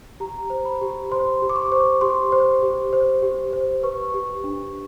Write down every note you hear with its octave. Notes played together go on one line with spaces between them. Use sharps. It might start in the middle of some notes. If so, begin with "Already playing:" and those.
G4 A#5
C5
B5
G4
C5 C6
G4
D6
C#6
C5
G4 C6
C5
G4
C5
G4
C5
B4 C#6
G4
D4